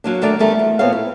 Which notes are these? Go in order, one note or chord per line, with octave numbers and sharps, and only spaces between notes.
F#3 A#3 D4
D#3 A3 D4 A#4 D5
E2 G2 G3 A3 A#4
E2
A#2 B3 C4 A4 C#5 F5
E4